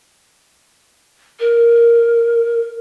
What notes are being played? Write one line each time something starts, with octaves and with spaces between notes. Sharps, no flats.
A#4